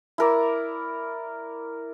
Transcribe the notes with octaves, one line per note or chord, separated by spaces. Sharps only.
E4 A#4 D5